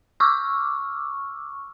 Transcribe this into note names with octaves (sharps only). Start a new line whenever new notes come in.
C#6 D6 E6 F6